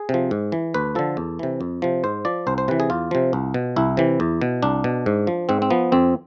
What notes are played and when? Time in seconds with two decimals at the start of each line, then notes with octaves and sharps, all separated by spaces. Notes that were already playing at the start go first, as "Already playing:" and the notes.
Already playing: G#4
0.09 C3 F3
0.31 G#2
0.52 E3
0.74 D2 B4
0.95 D3 F3 A4
1.17 E2
1.39 C3 E3
1.61 F2
1.82 C3 F3
2.04 G#2 C5
2.25 F3 D5
2.47 C2 C5
2.58 C5
2.68 C3 E3 B4
2.80 G#4
2.90 E2 F4
3.11 C3 F3
3.33 C2
3.54 B2
3.76 C2 E4
3.97 C3 E3
4.20 E2
4.41 B2
4.63 C2 D4
4.84 B2
5.06 G#2
5.27 F3
5.49 G#2 C4
5.62 C4
5.70 F3 B3
5.92 F2 C4